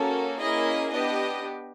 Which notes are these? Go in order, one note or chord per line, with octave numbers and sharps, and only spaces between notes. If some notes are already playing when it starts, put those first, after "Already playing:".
Already playing: A#3 C#4 F#4 A4
A#3 C#4 E4 G#4 D#5
B3 D4 G4 D#5